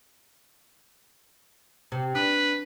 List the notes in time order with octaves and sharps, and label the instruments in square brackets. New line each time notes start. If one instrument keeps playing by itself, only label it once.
[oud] C3
[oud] D4 [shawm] B4